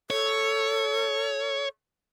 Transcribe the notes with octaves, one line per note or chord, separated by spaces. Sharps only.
A4 C#5